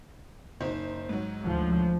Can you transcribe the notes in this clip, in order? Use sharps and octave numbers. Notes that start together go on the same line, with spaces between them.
F#1 D#4 C5
G#2 F#3
D2 F3